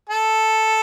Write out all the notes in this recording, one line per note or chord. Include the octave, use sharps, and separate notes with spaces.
A4